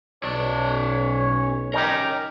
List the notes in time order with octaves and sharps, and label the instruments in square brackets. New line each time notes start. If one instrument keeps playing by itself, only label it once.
[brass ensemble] B1 [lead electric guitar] C#4 D5 [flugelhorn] C#5
[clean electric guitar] C#4 D#4 G4 [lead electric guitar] A#4